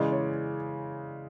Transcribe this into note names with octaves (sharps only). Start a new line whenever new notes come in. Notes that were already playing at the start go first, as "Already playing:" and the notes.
Already playing: C#3 E3 G#3 D5
C#5